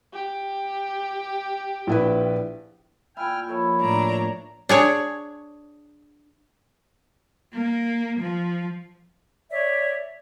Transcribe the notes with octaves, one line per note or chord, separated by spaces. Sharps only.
G4
A#1 E4 B4
A#2 E4 G5 G#5 F6
F3 A#3 A4 B4 C#5 E5
A2 D4 A#5
D4 G#4 C#5
A#3
F3
C#5 D5 E5